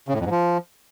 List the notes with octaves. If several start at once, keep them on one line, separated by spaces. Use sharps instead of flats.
C#3
A2
F2
G#2
F3